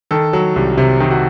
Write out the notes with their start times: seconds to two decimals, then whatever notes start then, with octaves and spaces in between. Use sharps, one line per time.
0.11 D#3 A4
0.33 F#3
0.56 C2
0.78 C3
1.00 D#3
1.11 F#4